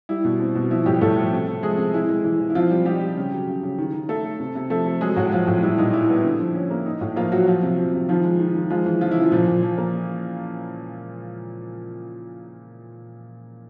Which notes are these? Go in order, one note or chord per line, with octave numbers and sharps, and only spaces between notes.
G3 E4
B2
C4
B2
F3 E4
A2 G3 G4
A2 A3 A4
F3
C3
C3
F3 G#3 G#4
C3
G#3 E4
G#3
E3
E3
E4
F3 C4 F4
G3
G3 D#4 G4
G3
C#3
F#3
C#3
C#3
D#3
D#3
A3 A4
A3
C3
C3
F3 A3 A4
C3
F#3 G#3 G#4
A2 F#3 F#4
A2 F3 F4
A2
G3 E4
A#2 D#4
G3 E4
B3
D3
F3
C#4
A#3
D#4
A2
F3 A#3 F4
F3 F#3 F#4
F3 F4
C3
F3
C3
D#3 F3 F4
G#3
D#3
D#3
F3 G#3 F4
E3
C#3 F3 F4
E4
C#3
F3 F4
A#2 F3 F4
A#2
F3
A#3